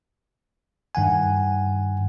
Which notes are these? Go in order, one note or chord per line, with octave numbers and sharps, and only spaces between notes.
G2 D#3 F#5 G#5